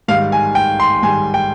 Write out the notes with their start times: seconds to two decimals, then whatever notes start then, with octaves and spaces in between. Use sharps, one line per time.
0.08 G#2 D#3 G3 F5
0.32 G#5
0.55 G5
0.80 C6
1.02 G#2 D#3 G3 G#5
1.34 G5